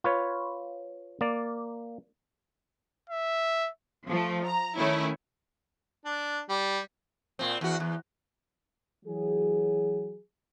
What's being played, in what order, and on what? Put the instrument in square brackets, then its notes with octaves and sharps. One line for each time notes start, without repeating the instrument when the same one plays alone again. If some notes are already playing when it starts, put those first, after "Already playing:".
[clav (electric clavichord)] F4 B4 C#5
A#3 D5
[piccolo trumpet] E5
[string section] F3 A3
A#5
D#3 A3 C#4 E4
[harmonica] D4
G3
[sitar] A#2 C4
E2 F#4
E2
[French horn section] E3 F#3 G#4